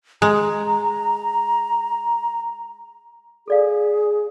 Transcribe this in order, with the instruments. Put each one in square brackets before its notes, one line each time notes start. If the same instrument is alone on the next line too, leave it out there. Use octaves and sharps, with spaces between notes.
[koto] G#3 [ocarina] A#5
[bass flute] G#4 [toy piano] A4 D5 F5